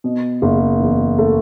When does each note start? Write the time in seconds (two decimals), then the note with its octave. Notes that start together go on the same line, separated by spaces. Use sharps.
0.04 B2
0.42 F#1
0.80 E2
1.19 A3